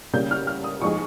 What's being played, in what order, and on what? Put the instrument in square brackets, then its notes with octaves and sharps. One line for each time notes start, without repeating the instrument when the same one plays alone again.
[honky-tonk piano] C#3 G3 A#3 [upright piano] G6
[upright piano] F6
F6
D#6
[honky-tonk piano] F3 G#3 D#4 G#4 [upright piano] C#6